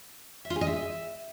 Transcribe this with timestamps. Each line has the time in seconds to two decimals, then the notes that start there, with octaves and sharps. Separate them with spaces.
0.45 E5
0.50 F4
0.56 G#4
0.61 D#5
0.67 E5